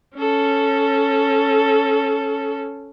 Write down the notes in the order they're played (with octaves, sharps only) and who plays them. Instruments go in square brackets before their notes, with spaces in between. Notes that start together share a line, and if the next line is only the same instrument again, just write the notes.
[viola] C#4 A4